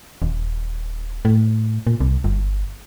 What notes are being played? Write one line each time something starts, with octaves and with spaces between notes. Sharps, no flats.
D#1
A2
A#2
C2
G1